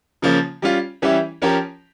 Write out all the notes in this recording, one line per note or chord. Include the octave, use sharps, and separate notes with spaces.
C#3 F3 A#3 C#4
G3 C#4 F4
E3 G3 C#4 E4 G4
F3 C#4 G4 A#4